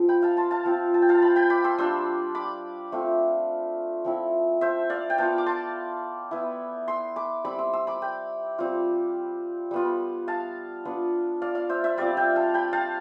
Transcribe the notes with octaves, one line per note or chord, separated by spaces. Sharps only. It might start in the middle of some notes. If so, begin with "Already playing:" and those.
Already playing: F3 C4 F4
G5 B5
F5 A5
A5 C6
F5 A5
F3 C4 F4
A5
G5
F5 A5
G5 B5
G5 B5
B5 D6
C6 E6
G3 D4 F4 C6 E6
B5 D6
A3 C4 F4
F3 C4 E4
C5 E5
D5 F5
G5
B3 F4 F5 A5
D6
A5 C6
B3 E4
C6 E6
B5 D6
G3 C4 E4 B5 D6
C6 E6
C6 E6
B5 D6
G5 B5
G3 C4 F4
G3 B3 F4
F5 A5
B3 D4 F4
D5 F5
D5 F5
C5 E5
C5 E5
G3 C4 F4 D5 F5
E5 G5
F5 A5
G5 B5
F5 A5